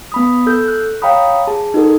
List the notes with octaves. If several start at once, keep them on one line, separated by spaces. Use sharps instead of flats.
B3 B5 D#6
A4 E6 G6
F#6
C#5 F5 G5 A#5 B5 D#6
G#4 A5
D#4 F#4 A4 A#4